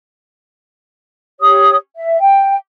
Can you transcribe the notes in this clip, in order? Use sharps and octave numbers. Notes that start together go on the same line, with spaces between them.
G4 C#5 D#6
E5
G5